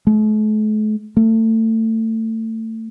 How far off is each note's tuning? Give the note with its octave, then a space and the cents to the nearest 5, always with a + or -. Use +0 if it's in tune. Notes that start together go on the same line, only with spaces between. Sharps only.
A3 -45
A3 +25